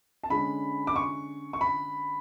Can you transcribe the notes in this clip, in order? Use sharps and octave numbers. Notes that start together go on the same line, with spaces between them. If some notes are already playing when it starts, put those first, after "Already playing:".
A5
D3 G#3 C#4 B5
D6
C#6
C#6
B5